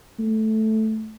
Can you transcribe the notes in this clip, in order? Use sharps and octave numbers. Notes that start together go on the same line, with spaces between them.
A3